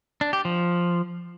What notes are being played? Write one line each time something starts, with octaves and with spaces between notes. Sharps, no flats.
D4
G4
F3